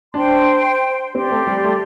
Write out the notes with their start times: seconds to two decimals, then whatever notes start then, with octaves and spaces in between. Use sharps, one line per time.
0.14 D4 C5 G5 C6
1.15 C4 G4 D5 C6
1.31 A3
1.47 G3
1.64 A3